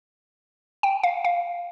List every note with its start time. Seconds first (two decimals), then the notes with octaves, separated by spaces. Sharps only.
0.83 G5
1.03 F5
1.25 F5